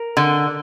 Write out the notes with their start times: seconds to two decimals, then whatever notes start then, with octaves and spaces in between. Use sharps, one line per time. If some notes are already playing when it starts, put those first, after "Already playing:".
Already playing: A#4
0.17 D3